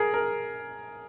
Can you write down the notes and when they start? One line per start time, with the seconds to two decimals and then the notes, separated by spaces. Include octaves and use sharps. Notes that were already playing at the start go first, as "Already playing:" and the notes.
Already playing: G#4 A#4
0.14 A#4